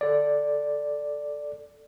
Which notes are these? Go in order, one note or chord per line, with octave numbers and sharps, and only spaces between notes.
A4 D5